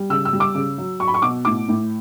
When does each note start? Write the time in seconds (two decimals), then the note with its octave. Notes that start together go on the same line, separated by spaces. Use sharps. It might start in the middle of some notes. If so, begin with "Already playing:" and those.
Already playing: G3
0.09 C#3 E6
0.25 E6
0.33 G3
0.40 D6
0.55 C#3
0.78 F#3
1.00 F#3 C#6
1.08 B5
1.14 C#6
1.22 B2 D6
1.45 A2 D6
1.68 A2